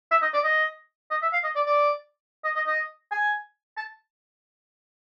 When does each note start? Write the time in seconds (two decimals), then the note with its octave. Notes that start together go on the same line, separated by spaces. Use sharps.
0.11 E5
0.22 D#5
0.34 D5
0.44 D#5
1.11 D#5
1.22 E5
1.33 F5
1.44 D#5
1.56 D5
1.67 D5
2.44 D#5
2.56 D#5
2.67 D#5
3.11 G#5
3.77 A5